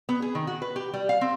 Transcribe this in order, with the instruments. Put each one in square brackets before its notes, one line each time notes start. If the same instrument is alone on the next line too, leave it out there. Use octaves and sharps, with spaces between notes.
[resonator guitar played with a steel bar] B3
G#4
D#3
F#4
B4
G4
G3
F5
C4